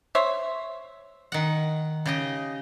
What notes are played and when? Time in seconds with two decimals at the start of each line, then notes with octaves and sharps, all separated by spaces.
0.15 C5 C#5 E5
1.32 D#3 F#5
2.06 C#3 G4 D#5